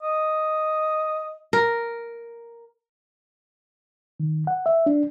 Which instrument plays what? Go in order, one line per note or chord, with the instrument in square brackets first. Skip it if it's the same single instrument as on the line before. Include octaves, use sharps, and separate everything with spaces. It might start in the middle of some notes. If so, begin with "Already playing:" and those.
[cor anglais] D#5
[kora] A#4
[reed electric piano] D#3
F#5
E5
D4